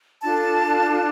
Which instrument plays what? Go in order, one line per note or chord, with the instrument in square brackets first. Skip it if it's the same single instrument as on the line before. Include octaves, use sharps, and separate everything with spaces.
[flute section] D4 F4 A4 A5